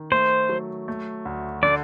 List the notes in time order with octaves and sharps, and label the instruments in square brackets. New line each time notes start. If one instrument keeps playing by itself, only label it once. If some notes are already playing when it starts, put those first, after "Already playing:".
Already playing: [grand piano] D#3
[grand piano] A3 [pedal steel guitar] C5
[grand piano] F#3
A3
D2
[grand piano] D3 [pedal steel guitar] D5